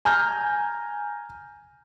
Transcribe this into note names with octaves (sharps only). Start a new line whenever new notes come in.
G#5 A#5 F6 G6